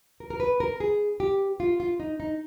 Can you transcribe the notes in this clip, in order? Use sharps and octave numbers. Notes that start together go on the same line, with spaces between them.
A#4
A#4
B4
A#4
G#4
G4
F4
F4
D#4
D#4